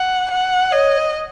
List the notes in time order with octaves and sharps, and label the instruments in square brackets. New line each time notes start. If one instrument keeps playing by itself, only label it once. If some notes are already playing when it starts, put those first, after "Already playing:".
Already playing: [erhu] F#5
F#5
[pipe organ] C#5 [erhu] D#5